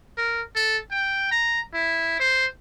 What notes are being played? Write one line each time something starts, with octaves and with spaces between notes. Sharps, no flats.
A#4
A4
G5
A#5
E4
C5